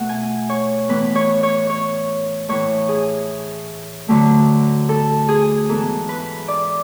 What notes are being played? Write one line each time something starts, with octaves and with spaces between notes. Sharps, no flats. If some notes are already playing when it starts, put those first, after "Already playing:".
Already playing: B2 A3 E5 F#5
G#5
C#5
A2 E3 B3 B4
C#5
C#5
C#5
A2 E3 A3 C#5
G#4
D2 D3 F#3 A3
A4
G#4
G#2 E3 B3 A4
B4
D5